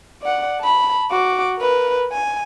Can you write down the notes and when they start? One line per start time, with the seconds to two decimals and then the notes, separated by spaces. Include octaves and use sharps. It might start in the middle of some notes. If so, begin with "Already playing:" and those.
0.22 D5 F#5
0.60 A5 B5
1.11 F#4 D6
1.58 A#4 B4
2.12 G#5